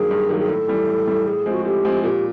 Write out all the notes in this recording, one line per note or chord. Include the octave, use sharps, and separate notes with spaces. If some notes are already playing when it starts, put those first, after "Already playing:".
Already playing: G2 D#3 F#3 A#3 G#4
G2
D#3 F#3 A#3
G#4
A2 A4
E3 G3
A2
E3 G3
A2 G#4
F3 G#3 C4
F#4
A2 G4
F3 G#3 C4
A#2 G4